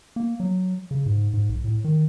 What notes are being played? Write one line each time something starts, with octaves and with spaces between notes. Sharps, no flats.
A#3
F#3
C#3
G#2
G#2
B1
A2
D#3